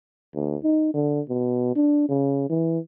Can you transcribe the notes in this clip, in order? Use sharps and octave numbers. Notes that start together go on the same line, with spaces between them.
D2
D#4
D3
B2
D4
C#3
E3